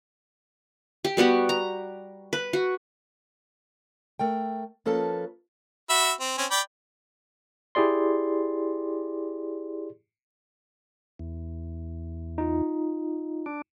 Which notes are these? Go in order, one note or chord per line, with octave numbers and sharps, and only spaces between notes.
G4
G3 B3 F#4 G4
A#5
B4
F#4
A3 A#4 G5
F3 A#3 C#4 A4 B4 A5
F#4 E5 B5
C4
C4 C#4
D5 G5 B5
E4 G4 G#4 D5 C6
E2
D#4 F4
D4